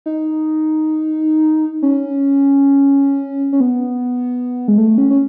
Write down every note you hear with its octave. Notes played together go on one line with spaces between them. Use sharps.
D#4
C#4
C#4
B3
G#3
A3
C#4
C#4